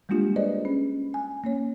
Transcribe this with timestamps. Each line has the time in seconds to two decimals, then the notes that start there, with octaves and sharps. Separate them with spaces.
0.09 G3 G#3 A#3 D4 F4 G4
0.36 G#4 B4 C5 D5 D#5
0.65 C#4
1.14 G#5
1.44 A#3 C#4 C#5